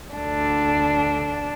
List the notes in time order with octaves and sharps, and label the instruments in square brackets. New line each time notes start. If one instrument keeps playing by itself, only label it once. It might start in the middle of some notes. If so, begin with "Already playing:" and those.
[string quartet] D2 D3 D4